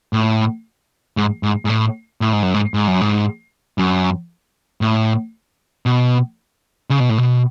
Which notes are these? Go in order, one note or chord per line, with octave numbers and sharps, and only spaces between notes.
A2
G#2
G#2
G#2
A2
A2
G#2
F#2
G#2
G#2
F#2
G#2
F#2
A2
B2
C#3
B2
A2
B2